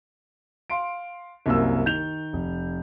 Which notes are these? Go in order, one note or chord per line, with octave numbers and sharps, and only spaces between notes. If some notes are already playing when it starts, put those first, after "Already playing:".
F5 C6 D7
C2 F#2 A#3 E6
D#3 G6 F7
F1